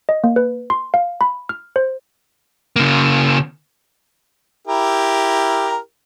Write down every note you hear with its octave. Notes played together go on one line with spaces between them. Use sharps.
D#5
A#3
B4
C6
F5
B5
F6
C5
C#3 A#3
E4 G4 A#4